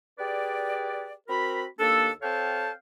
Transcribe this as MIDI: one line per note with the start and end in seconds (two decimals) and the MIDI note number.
0.19 1.12 67
0.19 1.12 68
0.19 1.12 71
0.19 1.12 74
1.28 1.64 60
1.28 1.64 66
1.28 1.64 70
1.28 1.64 83
1.78 2.10 39
1.78 2.10 58
1.78 2.10 62
1.78 2.10 69
2.22 2.71 60
2.22 2.71 69
2.22 2.71 73
2.22 2.71 77
2.22 2.71 79
2.22 2.71 81